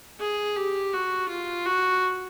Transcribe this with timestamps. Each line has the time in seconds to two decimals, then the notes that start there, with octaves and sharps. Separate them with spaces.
0.20 G#4
0.57 G4
0.93 F#4
1.29 F4
1.65 F#4